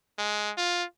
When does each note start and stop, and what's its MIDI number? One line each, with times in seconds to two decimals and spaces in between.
0.18 0.52 56
0.57 0.84 65